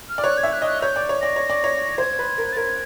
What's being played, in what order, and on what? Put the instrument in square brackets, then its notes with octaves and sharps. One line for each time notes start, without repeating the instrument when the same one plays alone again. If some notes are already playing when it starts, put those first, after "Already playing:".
[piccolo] F6
[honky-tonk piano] D5
[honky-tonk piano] C#5 [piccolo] F#6
[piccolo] G#6
[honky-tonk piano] E5
[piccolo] F#6
[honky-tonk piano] D#5
[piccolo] F#6
[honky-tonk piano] C#5 [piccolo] G6
[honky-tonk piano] D5
C#5
[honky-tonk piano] D5 [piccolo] A#6
[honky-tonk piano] C#5
D5
C#5
[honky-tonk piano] C5 [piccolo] G#6
[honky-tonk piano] B4
A#4
[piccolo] A6
[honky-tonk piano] A#4 [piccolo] G#6